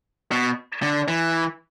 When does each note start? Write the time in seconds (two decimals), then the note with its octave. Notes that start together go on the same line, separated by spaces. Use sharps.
0.31 B2
0.83 D3
1.08 E3